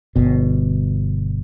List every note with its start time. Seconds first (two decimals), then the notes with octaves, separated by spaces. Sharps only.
0.16 G1 B2